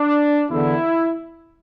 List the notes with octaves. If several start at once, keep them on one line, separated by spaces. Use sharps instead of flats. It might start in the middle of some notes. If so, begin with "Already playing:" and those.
Already playing: D4
E2 D3 E4